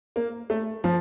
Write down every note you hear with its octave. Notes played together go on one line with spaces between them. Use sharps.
A#3
A3
F3